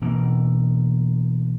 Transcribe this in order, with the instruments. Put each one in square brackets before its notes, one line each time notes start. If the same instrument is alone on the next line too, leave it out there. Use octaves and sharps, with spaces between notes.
[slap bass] B2 E3 A#3